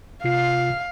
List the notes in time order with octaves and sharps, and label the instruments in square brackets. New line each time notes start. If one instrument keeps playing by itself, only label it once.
[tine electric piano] C3 F4 C7 [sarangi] F5